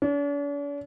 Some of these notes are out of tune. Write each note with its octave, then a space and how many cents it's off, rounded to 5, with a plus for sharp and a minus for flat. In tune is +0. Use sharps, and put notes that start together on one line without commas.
D4 -45